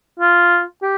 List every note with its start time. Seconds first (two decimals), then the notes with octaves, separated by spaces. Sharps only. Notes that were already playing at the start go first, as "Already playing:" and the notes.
0.20 F4
0.82 G4